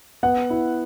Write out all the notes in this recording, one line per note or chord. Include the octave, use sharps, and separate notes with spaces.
B3 F#5
E4